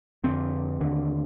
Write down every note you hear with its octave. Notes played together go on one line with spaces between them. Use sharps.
F2 D3 C4
D#2 D3